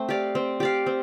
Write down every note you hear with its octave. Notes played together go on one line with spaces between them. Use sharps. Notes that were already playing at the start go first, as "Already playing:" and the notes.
Already playing: A3 C4
G4 D5 F5
C4
G4 D5 F5
C4